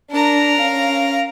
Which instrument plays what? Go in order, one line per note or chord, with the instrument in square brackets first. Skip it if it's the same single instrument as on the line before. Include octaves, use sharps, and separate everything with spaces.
[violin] D4 [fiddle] A#4 A#5
[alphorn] C#4 [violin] F5